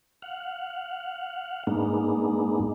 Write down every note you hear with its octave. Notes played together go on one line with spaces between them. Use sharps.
F5 F#5
G#2 G#3 A#3 B3 D4 D#4